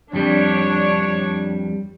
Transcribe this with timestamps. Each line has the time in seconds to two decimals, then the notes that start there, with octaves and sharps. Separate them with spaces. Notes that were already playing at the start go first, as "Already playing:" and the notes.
0.13 F2 G3 D4 C#5